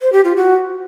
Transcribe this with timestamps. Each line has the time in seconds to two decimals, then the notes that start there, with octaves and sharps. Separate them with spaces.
0.01 C5
0.13 G4
0.24 F4
0.36 F#4